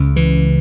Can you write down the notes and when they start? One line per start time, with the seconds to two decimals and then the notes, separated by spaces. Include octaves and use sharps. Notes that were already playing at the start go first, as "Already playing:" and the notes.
Already playing: C#2 C#3
0.16 E3